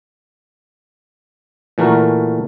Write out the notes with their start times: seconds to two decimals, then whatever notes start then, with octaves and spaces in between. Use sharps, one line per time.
1.78 A#2 E3 A3 F#4 A#4